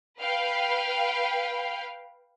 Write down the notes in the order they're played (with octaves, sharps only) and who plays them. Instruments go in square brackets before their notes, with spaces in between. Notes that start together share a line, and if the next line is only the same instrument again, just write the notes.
[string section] B4 F5 G5